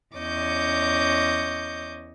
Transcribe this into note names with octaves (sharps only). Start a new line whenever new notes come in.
E2 C#4 C#5 D#5 D6 G6